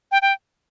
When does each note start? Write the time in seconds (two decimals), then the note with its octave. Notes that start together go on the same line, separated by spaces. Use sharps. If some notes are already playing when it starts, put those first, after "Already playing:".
0.12 G5
0.22 G5